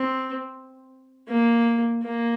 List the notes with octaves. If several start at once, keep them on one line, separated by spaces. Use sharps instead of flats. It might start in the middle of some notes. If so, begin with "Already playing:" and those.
Already playing: C4
A#3
A#3